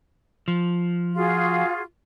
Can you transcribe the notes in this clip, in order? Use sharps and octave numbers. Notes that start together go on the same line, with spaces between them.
F3
F4 F#4 G#4